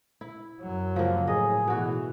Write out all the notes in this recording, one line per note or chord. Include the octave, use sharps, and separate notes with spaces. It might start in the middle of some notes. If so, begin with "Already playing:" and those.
E4
F#2 F#3
C#3 F3 A#3
A2 G#4 D#5
B2 E3 F#4